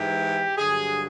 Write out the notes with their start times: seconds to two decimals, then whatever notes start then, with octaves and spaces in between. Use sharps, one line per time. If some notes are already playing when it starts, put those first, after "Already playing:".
Already playing: G#2 E3 G4
0.57 G2 D3 F#3 G#4